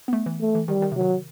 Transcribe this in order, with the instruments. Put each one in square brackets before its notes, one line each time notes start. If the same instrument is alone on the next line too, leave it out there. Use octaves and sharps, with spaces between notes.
[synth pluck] B3
A3
E3
[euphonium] A3
[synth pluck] E3
[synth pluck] D#3 [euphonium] G3
[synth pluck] D#3
C3
[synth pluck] D#3 [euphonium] F#3